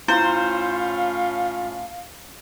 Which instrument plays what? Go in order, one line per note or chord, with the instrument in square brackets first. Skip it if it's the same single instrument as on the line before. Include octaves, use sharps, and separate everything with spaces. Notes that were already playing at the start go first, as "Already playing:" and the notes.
[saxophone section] A2 C#4 F4 [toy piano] E4 [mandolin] C5 [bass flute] F5